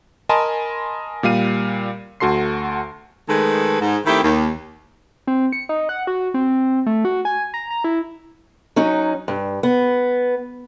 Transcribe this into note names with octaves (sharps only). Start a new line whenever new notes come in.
A#4 D#5 G#5 A5 B5 C6
A#2 G3 F5 D#7
D2 F#4 A4 C6 C7
D#3 G#3 A3 A4 B4
G#2
D#3 A3 C4 E4 G4
D#2
C4
C#7
D#4
F#5
F#4
C4
A3
F#4
G#5
A#5
A#5
E4
F#3 C#4 D#4
G2
B3